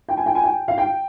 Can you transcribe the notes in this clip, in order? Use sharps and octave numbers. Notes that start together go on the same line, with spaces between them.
G5
G#5
G5
G#5
G5
F5
G5